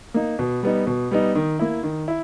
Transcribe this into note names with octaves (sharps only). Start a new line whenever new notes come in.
A#3 D#4
B2
G3 B3 D#4
B2
G3 B3 D#4
D#3
A#3 E4
D#3
E4